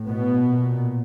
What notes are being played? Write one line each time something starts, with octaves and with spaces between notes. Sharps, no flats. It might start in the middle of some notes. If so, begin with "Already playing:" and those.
Already playing: A2
B2 B3
A#2